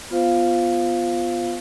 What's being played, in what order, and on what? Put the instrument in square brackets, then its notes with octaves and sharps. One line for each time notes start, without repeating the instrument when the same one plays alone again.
[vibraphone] B3 F4 C5 F5